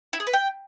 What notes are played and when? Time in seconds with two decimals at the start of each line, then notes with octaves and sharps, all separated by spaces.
0.13 E4
0.20 G#4
0.27 B4
0.33 G5